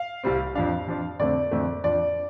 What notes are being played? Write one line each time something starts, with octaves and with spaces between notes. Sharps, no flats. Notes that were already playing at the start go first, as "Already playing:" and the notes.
Already playing: F5
C2 C3 G3 C4
F2 F3 D4 F5
F2 F3 D4
F2 D3 A3 C4 D5
F2 D3 A3 C4
F2 F3 D4 D5